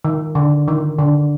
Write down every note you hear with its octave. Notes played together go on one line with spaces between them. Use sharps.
D#3
D3
D#3
D3